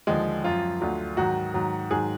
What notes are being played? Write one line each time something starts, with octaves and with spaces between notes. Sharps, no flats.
D#2 D3 F3 G#3
F#2 F3 F4
D2 D3 F#3
G#2 D#3 F#3 F#4
G#2 D#3 F#3
G#2 D#3 F#3 G#4